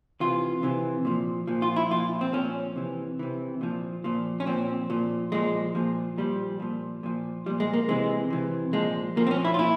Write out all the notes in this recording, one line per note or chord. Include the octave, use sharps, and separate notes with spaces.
C3 E3 F4
C3 E3
A#2 F3
A#2 F3
F4
E4
A#2 F3 F4
C4
A#2 F3 C#4
C3 E3
C3 E3
A#2 F3
A#2 F3
C#4
A#2 F3 C4
A#2 F3
A#2 F3 G#3
A#2 F3
A#2 F3 G3
A#2 F3
A#2 F3
A#2 F3 G3
G#3
A#3
C3 E3 G#3
C3 E3
A#2 F3 G#3
A#2 F3 A#3
C4
C#4
E4
F4
A#2 E4